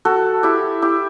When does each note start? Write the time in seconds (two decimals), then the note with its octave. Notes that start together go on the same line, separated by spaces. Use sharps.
0.05 F#4 A4
0.43 E4 G4
0.82 E4 G4